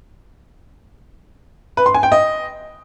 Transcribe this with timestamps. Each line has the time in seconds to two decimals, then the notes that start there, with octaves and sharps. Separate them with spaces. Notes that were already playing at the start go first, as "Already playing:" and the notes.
1.77 B4
1.86 C6
1.94 G#5
2.03 G5
2.12 D#5